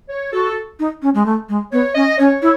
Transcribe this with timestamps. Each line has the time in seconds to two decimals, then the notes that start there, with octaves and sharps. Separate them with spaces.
0.09 C#5
0.33 F#4 A4
0.79 D#4
1.02 C#4
1.14 G#3
1.25 A3
1.48 G#3
1.72 B3 C#5
1.95 C#4 D#5
2.18 C#4 C#5
2.42 E4 C#5